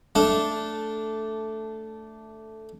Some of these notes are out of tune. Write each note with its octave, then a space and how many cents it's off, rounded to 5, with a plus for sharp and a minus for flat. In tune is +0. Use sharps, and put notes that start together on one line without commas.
A3 +0 D4 -10